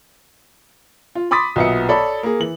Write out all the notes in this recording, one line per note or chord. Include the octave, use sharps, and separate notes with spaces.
F4
B5 C6 D6 D#6 A6 B6
B1 A#2 B3 E5 C#7
A4 C#5 D5 B5
A#3 G#4
E3 F#7